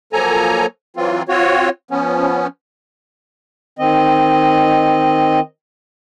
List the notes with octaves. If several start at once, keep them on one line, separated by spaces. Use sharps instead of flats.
F3 F#3 A#3 A4 G#5 A#5
E3 F#3 C4 F4
C4 F4 F#4 C#5
F3 B3 C#4
D#3 C4 D#5